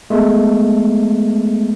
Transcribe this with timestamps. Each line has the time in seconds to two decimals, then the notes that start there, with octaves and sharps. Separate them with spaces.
0.10 G#3 A3 B3 A#4